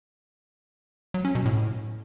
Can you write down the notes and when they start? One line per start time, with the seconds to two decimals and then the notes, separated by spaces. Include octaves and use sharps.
1.14 F#3
1.25 C#4
1.35 B2
1.45 A2